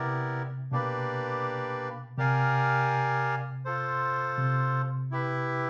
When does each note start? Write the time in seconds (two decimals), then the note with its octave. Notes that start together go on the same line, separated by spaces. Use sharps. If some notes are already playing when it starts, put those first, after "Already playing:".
Already playing: C3 B3 E4 G4 A#4 D5
0.71 B2 A#3 D4 G4 B4 D5
2.18 C3 G4 A#4 D5 F5 G#5
3.65 F4 A4 C5
4.38 C3
5.11 E4 G4 B4 E5